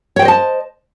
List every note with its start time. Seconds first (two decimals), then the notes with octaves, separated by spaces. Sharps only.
0.16 C#5
0.19 G5
0.22 C5
0.25 D#5
0.28 A5